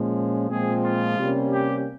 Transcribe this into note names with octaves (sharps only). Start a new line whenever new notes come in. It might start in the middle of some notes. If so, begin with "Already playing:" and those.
Already playing: A#2 F3 G#3 C#4
A#2 F3 G#3 C4 G#4
F4
C3 G3 A#3 C#4
G4